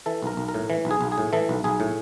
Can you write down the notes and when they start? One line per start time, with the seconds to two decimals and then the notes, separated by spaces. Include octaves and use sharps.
0.06 E3 A4
0.23 B1 A#4
0.37 B1
0.48 A#4
0.54 A2
0.70 E3
0.85 B1
0.91 G#4
1.01 B1
1.12 G#4
1.18 A2
1.33 E3 A4
1.49 B1
1.64 B1 G#4
1.80 A2